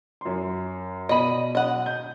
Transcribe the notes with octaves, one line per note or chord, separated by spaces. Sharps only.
F#2 C6
B2 D5 D#5 B5 D#7
D#5 F#5
G6